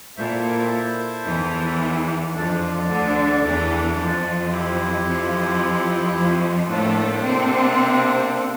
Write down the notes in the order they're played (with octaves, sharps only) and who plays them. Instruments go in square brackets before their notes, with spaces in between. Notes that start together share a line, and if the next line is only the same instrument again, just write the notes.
[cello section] A#2 [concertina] E4 A4 C5 E5
[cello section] E2 E3
[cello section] F2 F3 [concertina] D4 A4 D5
[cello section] D2 D3
E2 E3
F2 F3
[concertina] C4 E4 G4
[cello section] F2 F3
F2 F3
[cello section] A2 A3 [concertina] A#3 D4 A4 C5
[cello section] C3 C4